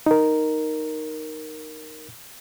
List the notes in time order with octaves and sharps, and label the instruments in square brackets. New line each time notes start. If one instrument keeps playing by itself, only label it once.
[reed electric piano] D#4 A#4